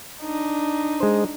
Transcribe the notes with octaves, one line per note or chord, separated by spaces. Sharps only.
D4 D#4
G#3 C5